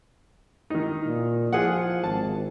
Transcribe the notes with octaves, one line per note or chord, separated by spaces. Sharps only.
D#3 D#4
A#2
F3 F4 G#4 F#5
G#1 A5